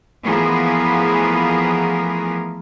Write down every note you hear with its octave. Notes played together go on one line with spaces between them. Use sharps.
E3 F3 A3 B3 G#4 A#4